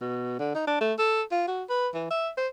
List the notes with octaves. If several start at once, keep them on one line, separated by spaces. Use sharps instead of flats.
B2
D3
D#4
D4
A3
A4
F4
F#4
B4
E3
E5
C5